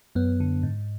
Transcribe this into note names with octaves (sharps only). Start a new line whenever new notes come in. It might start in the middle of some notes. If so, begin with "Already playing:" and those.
F#2 B3
D3
G#2